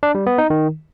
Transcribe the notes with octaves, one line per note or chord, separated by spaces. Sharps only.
D4
G3
B3
D#4
D#3